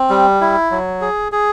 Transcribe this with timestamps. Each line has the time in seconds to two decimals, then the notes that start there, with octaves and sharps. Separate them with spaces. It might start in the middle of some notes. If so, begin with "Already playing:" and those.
Already playing: C4
0.10 G3
0.41 E4
0.71 F#3
1.01 G#4
1.32 G#4